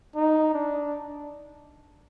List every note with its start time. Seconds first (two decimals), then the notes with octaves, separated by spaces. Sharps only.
0.16 D#4
0.54 D4